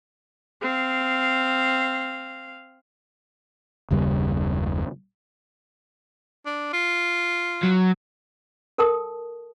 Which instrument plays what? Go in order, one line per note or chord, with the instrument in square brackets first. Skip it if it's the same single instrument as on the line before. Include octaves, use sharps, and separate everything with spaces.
[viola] C4 F5
[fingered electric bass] F#1 D#2 C#3 G3
[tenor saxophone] D4
F4
[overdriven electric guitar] F#3
[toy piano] A4 A#4 G5 A5 D#6